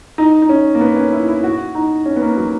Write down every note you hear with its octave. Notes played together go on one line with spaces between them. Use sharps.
D#4
D#4
C#4
A#3
B3
C#4
E4
E4
F#4
D#4
C#4
B3
A#3
F#3